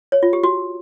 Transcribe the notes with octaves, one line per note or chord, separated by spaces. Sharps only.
C#5
F4
G4
F#4